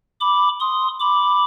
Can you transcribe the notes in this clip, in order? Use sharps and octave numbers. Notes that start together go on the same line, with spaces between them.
B5 D6
C6 D#6
B5 D6